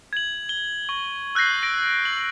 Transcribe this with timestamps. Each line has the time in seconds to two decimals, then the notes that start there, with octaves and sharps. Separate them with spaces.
0.13 G#6 F#7
0.49 G7
0.89 C#6
1.35 E6 F#6 G6 A#6 C7
1.63 A#6 D7
2.05 F#7